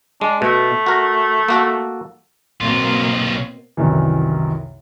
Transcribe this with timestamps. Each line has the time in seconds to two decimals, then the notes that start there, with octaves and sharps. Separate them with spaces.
0.21 G#3 D4
0.42 B2 A3
0.86 F#4 A#4
1.48 A#3 F#4 A4
2.61 B1 B2 A#3 C4 F4
3.77 C2 F#2 D#3 E3